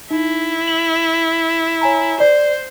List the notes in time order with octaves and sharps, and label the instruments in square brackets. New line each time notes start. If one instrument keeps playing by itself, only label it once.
[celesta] D#4 [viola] E4
[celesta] F#7
C#5 G#5 A#5
[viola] C5 [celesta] D5